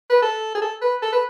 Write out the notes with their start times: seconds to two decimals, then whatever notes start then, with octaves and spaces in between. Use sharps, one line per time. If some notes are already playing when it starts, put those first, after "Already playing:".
0.10 B4
0.22 A4
0.55 G#4
0.62 A4
0.82 B4
1.02 A4
1.12 B4